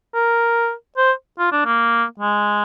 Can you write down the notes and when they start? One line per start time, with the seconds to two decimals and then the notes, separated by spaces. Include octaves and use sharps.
0.15 A#4
0.97 C5
1.38 F4
1.52 D4
1.66 A#3
2.20 G#3